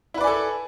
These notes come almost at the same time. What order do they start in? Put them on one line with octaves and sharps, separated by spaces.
E4 B4 D5 G#5 A4